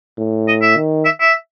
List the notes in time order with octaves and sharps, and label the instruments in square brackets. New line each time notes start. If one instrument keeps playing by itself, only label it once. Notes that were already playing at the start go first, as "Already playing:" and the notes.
[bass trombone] A2
[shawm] D#5
E5
[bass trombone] D#3
[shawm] E5
E5